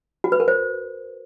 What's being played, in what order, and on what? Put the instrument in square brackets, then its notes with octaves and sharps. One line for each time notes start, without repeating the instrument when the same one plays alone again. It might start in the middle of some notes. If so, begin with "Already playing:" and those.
[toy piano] F#4
B4
A#4
C5